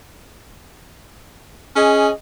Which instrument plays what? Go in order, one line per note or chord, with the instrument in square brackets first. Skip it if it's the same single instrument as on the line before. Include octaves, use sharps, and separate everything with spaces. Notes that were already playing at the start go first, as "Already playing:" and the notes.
[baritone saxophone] C#4 [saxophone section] G#4 D#5